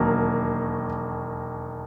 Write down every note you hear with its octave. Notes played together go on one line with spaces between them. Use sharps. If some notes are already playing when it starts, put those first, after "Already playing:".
Already playing: E1 D#2 D#3 F#3 A#3